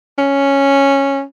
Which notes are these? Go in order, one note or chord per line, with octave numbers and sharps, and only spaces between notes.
C#4